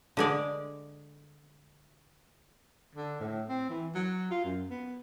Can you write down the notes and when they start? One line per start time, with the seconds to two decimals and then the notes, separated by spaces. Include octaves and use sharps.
0.17 D3 G#3 D5
2.96 D3
3.20 A2
3.49 C4
3.70 E3
3.95 F#3
4.31 F4
4.45 F#2
4.70 B3